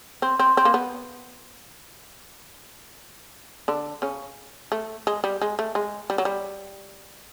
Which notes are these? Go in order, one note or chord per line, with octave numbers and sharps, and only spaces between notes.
C4
C4
C4
A#3
B3
D3 D4
C#3 C#4
A3
G#3
G3
G#3
A3
G#3
G3
F#3
G3